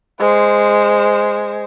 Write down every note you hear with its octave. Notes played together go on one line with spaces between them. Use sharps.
G#3 C5